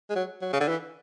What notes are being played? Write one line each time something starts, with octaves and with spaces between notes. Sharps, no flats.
G#3
F#3
F#3
C#3
D3
E3